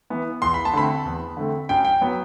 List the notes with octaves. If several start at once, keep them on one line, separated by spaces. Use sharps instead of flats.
E3 B3
E2 C6
B5
A5
D3 A3 C4 B5
E2
D3 A3 C4
F#2 G5
G5
F#3 B3